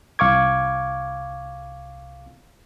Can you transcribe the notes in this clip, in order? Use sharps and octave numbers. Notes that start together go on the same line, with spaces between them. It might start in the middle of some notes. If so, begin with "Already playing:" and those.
C2 F5 C#6 D6 G#6